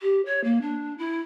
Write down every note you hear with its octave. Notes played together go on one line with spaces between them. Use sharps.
G4
C#5
A#3
D4
E4